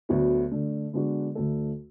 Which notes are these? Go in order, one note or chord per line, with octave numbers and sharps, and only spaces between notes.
D2 D3 F#3 B3 F#4
D3 A3 D4
D3 G#3 B3 D4 F#4
D2 D3 A3 D4 A4